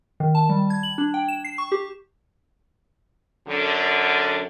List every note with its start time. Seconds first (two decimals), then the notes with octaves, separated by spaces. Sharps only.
0.20 D#3
0.35 A5
0.49 G3
0.70 G#6
0.83 F#7
0.98 D4
1.14 G5
1.28 E7
1.44 C7
1.58 C#6
1.72 G4
3.48 F#2 D3